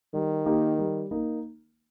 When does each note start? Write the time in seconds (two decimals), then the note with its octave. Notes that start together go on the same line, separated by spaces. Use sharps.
0.14 D#3 G3
0.46 A#3 D#4 G4
0.79 G3
1.11 A#3 D#4